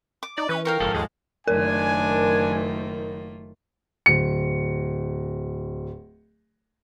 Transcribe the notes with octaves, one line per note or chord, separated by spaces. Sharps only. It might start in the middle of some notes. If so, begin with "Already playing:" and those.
D6
D#4 D5
E3 C#4 B4
F2 D#3 A#4 F5 G5 C#6
F#1 G#2 F3 A4
D#2 G#3 G#4
F#1 D#3 A3 A#3 D4 F4 A#4 G#5
D1 C#7